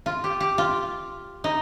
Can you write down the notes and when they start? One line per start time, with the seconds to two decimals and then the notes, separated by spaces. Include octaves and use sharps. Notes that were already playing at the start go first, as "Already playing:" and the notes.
0.06 F4
0.24 G4
0.40 G4
0.58 F4
1.44 D#4